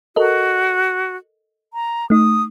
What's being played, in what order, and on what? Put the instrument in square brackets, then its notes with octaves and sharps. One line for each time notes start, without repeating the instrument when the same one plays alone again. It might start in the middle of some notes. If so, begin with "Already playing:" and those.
[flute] F#4 [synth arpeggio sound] A4 A#4 D#5
[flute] A#5
[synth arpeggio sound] A3 D#4 [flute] D#6